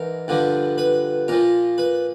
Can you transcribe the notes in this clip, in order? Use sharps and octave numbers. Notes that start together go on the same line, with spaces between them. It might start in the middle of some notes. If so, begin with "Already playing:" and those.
Already playing: G#2 E3 A#4
G2 D3 F3
B4
A#2 F3 A#4
B4